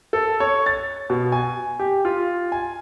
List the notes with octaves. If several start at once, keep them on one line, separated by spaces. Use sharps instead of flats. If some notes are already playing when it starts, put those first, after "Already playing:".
A4
C#5
A6
B2
G#5
G4
F4
G#5